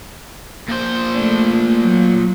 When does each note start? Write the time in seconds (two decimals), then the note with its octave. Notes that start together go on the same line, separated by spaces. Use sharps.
0.69 A#2 C5
1.14 A3 D4
1.81 F#3